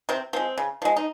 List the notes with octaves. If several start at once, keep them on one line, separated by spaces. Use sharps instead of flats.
C3 C4
F3 G#3 C4
C#3
F3 G#3
D#4